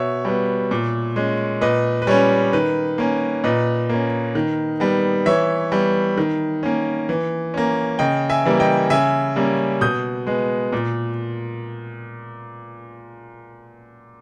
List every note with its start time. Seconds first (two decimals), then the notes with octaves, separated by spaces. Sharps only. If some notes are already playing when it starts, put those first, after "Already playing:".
Already playing: B2 C#5 E5
0.25 G3 B3
0.71 A#2
1.16 G#3 C#4
1.61 A#2 B4 D#5
2.02 B4
2.07 G3 C#4 C#5
2.53 D#3 B4
2.98 A#3 C#4
3.44 A#2 B4 D#5
3.89 A#3 C#4
4.35 D#3
4.80 G3 B3
5.26 E3 C#5 E5
5.72 G3 B3
6.18 D#3
6.63 A#3 C#4
7.09 E3
7.54 A#3 C#4
7.99 C#3 D#5 G5
8.29 E5 G#5
8.45 E3 G3 A#3
8.60 D#5 G5
8.90 C#3 E5 G#5
9.36 G3 A#3 C#4
9.81 B2 D#6 G6
10.27 G#3 B3
10.72 A#2